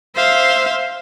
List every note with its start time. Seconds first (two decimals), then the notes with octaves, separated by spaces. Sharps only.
0.16 C5 E5 F5